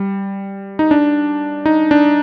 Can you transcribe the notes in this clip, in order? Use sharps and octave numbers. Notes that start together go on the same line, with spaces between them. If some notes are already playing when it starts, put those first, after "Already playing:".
Already playing: G3
D#4
D4
D#4
D4